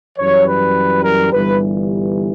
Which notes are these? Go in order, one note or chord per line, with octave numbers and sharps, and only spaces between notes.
F#2 E3 G3 C#5
B4
A#4
G1 G2 E3 G3 B4